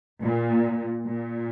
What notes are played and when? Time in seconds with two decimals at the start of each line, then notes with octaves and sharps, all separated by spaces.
0.22 A#2
1.07 A#2